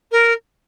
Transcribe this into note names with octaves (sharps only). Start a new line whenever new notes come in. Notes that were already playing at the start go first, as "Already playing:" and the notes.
A#4